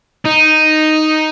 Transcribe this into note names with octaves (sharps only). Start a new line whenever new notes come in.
D#4